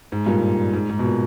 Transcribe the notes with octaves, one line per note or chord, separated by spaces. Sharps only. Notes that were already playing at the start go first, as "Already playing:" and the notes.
G#2
G2 A#2
G#2
G#2
B2
A#2